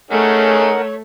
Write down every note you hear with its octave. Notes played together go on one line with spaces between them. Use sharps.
A3 C#4 D#4 G#4 A#4 C#5 F#5